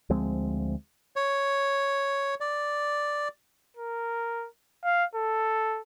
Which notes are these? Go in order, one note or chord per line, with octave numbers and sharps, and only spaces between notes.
D2 F3 G#3 C4
C#5
D5
A#4
F5
A4